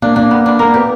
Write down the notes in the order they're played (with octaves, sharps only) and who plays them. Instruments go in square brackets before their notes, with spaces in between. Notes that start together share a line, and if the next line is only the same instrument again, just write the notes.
[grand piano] A#3 [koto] D4
[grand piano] A#3 [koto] D4
[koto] B3
D4
[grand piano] A#3 [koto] A#4
[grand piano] B3 [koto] G4